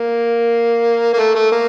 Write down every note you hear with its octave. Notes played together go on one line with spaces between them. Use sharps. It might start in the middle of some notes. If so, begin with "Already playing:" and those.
Already playing: A#3
A#3
A3
A3
A#3